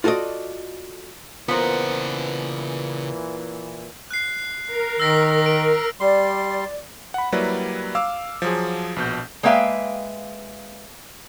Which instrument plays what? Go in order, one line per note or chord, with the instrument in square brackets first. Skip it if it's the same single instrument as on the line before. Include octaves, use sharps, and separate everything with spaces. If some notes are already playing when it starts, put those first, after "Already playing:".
[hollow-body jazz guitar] F4 F#4 A4 D5 D#5
[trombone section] A#2 E3 [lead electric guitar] C#3 F#5 [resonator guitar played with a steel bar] B3 C5 [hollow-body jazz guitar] F4 A#4
[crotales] F#6 C7
[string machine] A#4
[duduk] D#3 [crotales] E6 A#6 B6
[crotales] B6 D7
[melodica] G3 C6 [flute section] D5
[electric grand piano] F#5 B5
F#3 G3 A#3 E4 B4 D5
F5 D6 E6
F3 F#3 G#4
A#1 B2 G6
[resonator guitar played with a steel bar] G#3 A#3 B4 E5 F5 G5